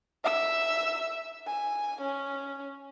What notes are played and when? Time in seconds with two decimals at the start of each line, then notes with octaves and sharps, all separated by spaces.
0.25 E5 E6
1.48 G#5
2.02 C#4